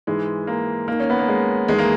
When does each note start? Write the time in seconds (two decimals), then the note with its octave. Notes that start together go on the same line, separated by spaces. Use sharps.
0.07 G#2 E3 G#3
0.47 A#3
0.87 D#2 D#3 A#3
1.00 C#4
1.10 B3
1.19 A#3
1.28 G#3
1.68 E2 D#3 G#3
1.79 A#3